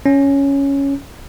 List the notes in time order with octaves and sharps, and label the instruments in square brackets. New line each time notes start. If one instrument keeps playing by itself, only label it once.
[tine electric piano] C#4